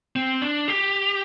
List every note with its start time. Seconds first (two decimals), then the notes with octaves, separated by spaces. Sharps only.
0.16 C4
0.42 D4
0.68 G4